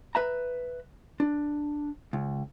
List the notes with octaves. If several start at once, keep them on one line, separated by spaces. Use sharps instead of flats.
B4 E5 A#5
D4
C#2